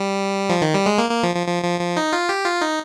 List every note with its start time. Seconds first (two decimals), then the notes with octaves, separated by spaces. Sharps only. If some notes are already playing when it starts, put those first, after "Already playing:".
Already playing: G3
0.49 F3
0.61 D#3
0.74 G3
0.86 G#3
0.98 A#3
1.10 A#3
1.23 F3
1.35 F3
1.47 F3
1.64 F3
1.80 F3
1.97 D#4
2.13 F4
2.29 G4
2.45 F4
2.61 D#4